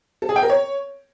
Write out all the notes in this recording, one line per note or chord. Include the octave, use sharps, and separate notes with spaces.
A4
G#4
G5
A#4
C#5